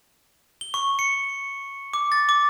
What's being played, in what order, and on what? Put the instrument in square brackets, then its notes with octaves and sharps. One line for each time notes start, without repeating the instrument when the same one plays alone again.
[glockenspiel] G7
C#6
C#7
D6
A6
D6